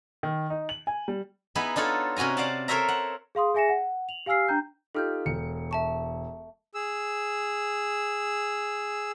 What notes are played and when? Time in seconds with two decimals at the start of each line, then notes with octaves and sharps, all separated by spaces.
0.23 D#3
0.50 D#4
0.69 F#7
0.87 G#5
1.08 G3
1.55 B3 D#4 E4 G#4
1.76 D4 D#4 F4 A4 C#5
2.16 C3 C#4 F#4 G#5 A#5
2.37 C5 D5 F5 F#5 A5
2.68 A4 A#4 C5 C#5 E5 A#5
2.88 F#5
3.35 G#4 F5 C6 D#6
3.54 G#4 E5 G#5 A#6 C#7 E7
3.69 F#5
4.09 F7 F#7
4.26 G4 F5 G#5 E6 F6 C7
4.48 D4 G5 A#5 G6
4.95 D#4 F4 G4 A4 F6 G6
5.26 E1 C#7
5.71 E5 A5 C#6
6.75 G#4 E6